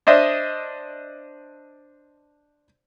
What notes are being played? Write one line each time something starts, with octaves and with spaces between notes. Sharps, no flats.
D4 C5 D#5 E5